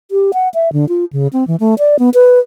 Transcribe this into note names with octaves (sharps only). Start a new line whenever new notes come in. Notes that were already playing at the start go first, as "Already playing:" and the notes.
G4
F#5
E5
D3
F4
C#3
C4
E3
A3
D5
B3
B4